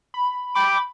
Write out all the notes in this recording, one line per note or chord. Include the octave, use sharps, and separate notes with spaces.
B5
G5 B5 D6